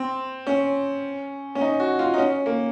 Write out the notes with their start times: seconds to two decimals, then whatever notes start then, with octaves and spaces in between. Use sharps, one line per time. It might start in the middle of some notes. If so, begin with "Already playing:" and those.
Already playing: C4
0.47 C#4
1.55 C#4
1.61 D#4
1.80 F#4
1.99 F4
2.14 D#4
2.18 C#4
2.46 A#3